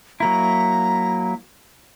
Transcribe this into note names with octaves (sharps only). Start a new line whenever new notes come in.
F#3 A#3 E4 A#5